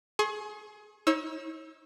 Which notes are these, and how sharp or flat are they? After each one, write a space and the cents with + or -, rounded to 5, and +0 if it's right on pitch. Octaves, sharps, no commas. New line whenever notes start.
G#4 +25 C#6 -45
D#4 +40 C#5 -30 E6 -5